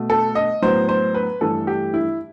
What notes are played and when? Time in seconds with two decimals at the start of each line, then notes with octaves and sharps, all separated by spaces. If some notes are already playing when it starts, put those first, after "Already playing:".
Already playing: B2 A3
0.10 A4
0.35 D#5
0.62 A2 F#3 B3 C5
0.89 C5
1.14 B4
1.41 G2 E3 A3 A4
1.67 G4
1.94 E4